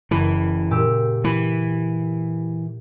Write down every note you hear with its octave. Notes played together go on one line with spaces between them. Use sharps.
F#1 E3
A#2 G4 E6
E3